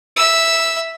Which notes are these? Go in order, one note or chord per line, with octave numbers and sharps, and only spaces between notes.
E5 E6